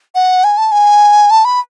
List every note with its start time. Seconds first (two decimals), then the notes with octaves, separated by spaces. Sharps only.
0.15 F#5
0.44 G#5
0.58 A5
0.72 G#5
1.31 A5
1.45 B5